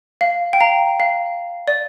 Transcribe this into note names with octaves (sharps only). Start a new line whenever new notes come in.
F5
G5
F5 A#5
F5
D5